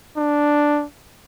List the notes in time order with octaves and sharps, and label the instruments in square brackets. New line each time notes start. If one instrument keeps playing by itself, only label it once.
[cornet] D4